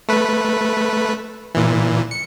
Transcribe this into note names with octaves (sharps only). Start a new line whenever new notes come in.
A3 B4
A#2 E3
C#7